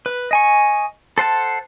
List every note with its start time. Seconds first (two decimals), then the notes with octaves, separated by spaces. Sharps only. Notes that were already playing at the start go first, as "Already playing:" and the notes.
0.06 B4
0.31 D#5 G#5 C#6
1.18 A4 C5 F#5 A5